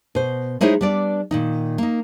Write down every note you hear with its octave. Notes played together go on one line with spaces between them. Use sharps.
B2 C5
G#3 D#4 E4 G#4 C5 C#5
G3 B3 D4 D5
A#2 D#3 D#4
A#3 D#4